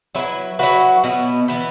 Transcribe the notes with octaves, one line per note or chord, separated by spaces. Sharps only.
F#3 E4 B4 E5
F#3 E4 F#4 B4
B2 B3 E4
E3 B3 E4